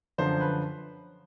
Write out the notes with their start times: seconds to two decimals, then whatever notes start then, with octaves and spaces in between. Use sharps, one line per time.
0.18 F#2 D3 F3 C5
0.41 B4